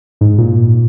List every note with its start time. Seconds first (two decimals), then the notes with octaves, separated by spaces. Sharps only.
0.21 G#2
0.38 A#2